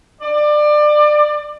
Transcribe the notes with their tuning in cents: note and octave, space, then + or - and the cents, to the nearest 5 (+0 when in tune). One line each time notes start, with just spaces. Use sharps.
D5 +25